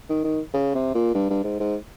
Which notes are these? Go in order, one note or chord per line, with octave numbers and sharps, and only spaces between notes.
D#3
D#3
C#3
C3
A#2
G2
G2
G#2
G#2